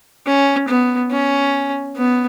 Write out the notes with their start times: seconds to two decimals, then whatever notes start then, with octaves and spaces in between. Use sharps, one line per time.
0.26 C#4
0.68 B3
1.11 C#4
1.96 B3